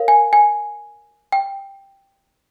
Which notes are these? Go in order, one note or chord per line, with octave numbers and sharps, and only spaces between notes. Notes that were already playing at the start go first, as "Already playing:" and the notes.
Already playing: A#4 C#5 F5
G#5
G#5
G5